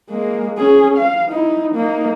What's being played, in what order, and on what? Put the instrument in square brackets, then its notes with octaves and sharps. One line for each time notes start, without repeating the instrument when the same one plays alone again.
[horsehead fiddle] G#3 A#3
C#4 G#4
F5
D#4 E4
A#3 D#4